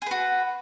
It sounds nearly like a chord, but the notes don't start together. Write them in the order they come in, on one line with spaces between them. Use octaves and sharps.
G#4 B4 F#4